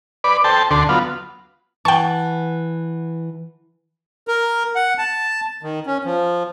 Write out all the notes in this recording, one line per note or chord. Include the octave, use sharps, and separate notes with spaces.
B4 D5
A4 C5 G5 A5
D2 D3 A4 C6
F#3 B3 F4
E3 F#5 G5 A5 C#6
A#4
F#5
A5
D#3
C#4
F3